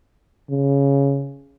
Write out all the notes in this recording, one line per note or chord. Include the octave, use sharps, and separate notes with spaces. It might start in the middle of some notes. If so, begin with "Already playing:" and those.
C#3